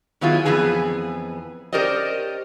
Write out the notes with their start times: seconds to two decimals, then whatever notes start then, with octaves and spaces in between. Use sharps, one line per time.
0.21 D#3 F#3 B3 E4 F4 G#4
0.45 F2 G#2 E3 B3 G#4 G#5
1.73 C#4 G4 A#4 C5 D5 D#5